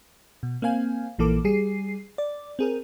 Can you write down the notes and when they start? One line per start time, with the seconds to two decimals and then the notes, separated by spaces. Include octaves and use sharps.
0.43 B2
0.62 A#3 C4 F5 G#5
1.19 A#1 E3 A#3 A4 D6
1.44 G3 G#4 C7
2.18 D5
2.59 C4 G#4 A#4